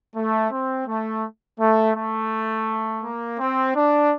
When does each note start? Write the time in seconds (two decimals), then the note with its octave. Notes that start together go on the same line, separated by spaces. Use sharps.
0.15 A3
0.51 C4
0.87 A3
1.60 A3
1.95 A3
3.03 A#3
3.39 C4
3.75 D4